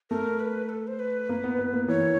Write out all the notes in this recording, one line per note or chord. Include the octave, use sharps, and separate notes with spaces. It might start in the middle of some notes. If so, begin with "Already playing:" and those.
A3 A#4
B4
A4
C5
B4
A#3
B3
B3
A#3
E3 C#5